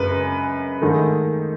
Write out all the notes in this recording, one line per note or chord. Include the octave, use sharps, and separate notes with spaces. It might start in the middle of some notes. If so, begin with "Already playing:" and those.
Already playing: F#2 C#3 G#3 B4
G#2 D#3 A3